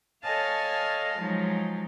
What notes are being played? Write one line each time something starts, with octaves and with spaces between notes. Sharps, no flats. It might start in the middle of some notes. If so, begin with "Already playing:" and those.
A4 C#5 D#5 F5 G#5 A5
F3 F#3 G#3 D#4